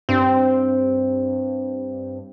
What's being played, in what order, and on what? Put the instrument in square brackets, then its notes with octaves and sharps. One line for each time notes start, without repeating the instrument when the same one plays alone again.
[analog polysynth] G2 [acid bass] C4